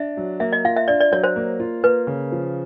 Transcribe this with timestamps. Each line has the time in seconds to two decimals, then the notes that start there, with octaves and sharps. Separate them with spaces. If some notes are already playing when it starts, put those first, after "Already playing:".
Already playing: D4 E5
0.17 F#3
0.40 A#3 E5
0.53 D#5
0.64 F4 F5
0.76 E5
0.88 D4 D5
1.00 D5
1.12 F#3 C#5
1.24 C5
1.36 A#3
1.60 F4
1.84 A#3 B4
2.07 C#3
2.32 F3